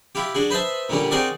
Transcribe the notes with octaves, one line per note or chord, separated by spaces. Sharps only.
E4 F4 G4
D4 F#4 G#4
B4 C5 D#5 E5 A5
A#2 D3 G3 C#4
C4 D#4 F#4 G#4 A#4 D5